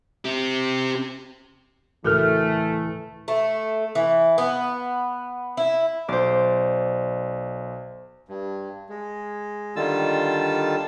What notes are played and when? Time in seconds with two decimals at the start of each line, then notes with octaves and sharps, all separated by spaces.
0.25 C4 G4
2.05 C#2 A2 E3 A3 F#4 A4 A#4 F6
3.28 A3
3.95 E3
4.38 B3
5.57 E4
6.08 B1 C5 D5
8.29 G2
8.89 G#3
9.76 D3 D#3 G3 F4 A5 E6